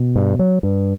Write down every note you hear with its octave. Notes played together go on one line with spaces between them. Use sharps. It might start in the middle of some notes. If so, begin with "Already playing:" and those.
Already playing: B2
G2
F#3
G2